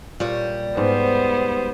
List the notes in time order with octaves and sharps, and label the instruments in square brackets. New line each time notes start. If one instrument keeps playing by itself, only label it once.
[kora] A#2 [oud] G3 C#5
[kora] G#2 [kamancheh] B3 C5